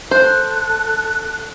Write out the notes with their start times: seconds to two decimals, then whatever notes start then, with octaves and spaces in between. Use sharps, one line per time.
0.11 A4 C5 F#6